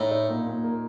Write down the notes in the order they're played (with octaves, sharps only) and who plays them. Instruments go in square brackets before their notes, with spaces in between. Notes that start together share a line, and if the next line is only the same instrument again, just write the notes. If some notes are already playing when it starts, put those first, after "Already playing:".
Already playing: [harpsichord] A2 [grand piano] D#4
[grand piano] D#4
A#2
A#2
A#3